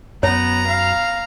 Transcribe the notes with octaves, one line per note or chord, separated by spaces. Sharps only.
F#2 B3 C#5 A#5
F5